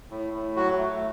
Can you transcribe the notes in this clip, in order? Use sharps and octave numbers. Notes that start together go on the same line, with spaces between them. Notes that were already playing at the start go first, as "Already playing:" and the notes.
A2
A2
F#3 F#4
A3